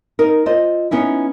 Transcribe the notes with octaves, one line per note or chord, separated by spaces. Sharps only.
D#4 A#4
F4 C5 D#5
B3 C#4 D#4 E4